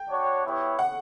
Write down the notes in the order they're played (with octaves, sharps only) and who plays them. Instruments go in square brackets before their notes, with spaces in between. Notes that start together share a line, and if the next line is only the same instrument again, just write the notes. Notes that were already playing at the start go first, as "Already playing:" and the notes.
Already playing: [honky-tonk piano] G5
[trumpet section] D4 F#4 C#5
B3 E4 G4 C#5
[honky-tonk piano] F#5